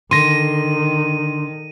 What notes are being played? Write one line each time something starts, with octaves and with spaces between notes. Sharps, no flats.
D3 D#3 C6 A#6 D#7